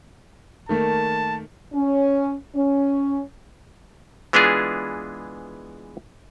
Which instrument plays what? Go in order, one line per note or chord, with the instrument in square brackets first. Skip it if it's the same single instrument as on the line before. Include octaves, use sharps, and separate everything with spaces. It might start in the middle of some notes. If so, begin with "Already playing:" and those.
[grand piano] D#3 A3 A#3 [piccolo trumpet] A5
[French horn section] C#4
C#4
[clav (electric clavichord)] E3 G#3 B3 D4 F4 G#4